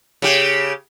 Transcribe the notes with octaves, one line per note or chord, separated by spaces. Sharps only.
C#3 G4